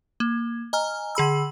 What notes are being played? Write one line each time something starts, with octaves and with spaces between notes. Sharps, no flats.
A#3
D#5 G#5 A#5 F6
D3 G#4 B5 E6